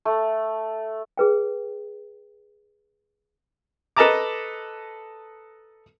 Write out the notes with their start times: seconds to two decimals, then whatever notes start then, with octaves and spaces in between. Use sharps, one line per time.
0.05 A3
1.17 G#4 B4 G5
3.97 A4 B4 D#5 A5 A#5 D6